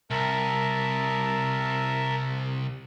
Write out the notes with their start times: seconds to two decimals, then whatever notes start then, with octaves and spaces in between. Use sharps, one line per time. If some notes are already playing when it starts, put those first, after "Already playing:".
0.11 C2 A#4 E5 A5